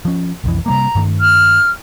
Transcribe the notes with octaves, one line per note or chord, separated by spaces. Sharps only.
F3 C#4
B1 F2 E3
C3 G3 A#3 A#5
G2 D#3 A3
F6